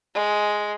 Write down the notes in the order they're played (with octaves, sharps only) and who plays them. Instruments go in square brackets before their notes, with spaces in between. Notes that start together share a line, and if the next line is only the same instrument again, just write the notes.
[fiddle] G#3